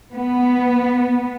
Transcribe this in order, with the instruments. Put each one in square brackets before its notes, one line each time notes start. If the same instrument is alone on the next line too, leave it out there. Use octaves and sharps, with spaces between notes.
[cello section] B3